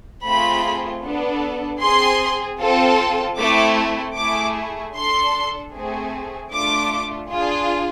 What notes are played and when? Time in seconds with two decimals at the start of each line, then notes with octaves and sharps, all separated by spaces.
0.25 A3 C4 F4 G#4 B5
1.03 B3 D4 A4
1.82 C4 G#4 C6
2.60 C4 F4 A4
3.38 A3 C4 E4 D6
4.17 A3 E4 G#4 D6
4.95 D4 A4 C6
5.73 A3 C4 G#4
6.51 A3 D4 F4 D6
7.30 D4 F4 G#4